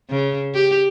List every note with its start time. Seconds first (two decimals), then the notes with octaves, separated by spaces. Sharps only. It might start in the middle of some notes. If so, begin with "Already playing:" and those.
0.10 C#3
0.55 G4